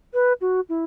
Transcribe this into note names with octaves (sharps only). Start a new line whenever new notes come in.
B4
F#4
E4